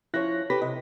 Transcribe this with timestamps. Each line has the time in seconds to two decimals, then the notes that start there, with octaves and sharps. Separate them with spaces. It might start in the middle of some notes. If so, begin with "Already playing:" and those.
0.14 F3 C#4 E4 C#5 F#6 A#6
0.50 G4 A4 B4 B5 A#6 B6
0.62 C3 D#5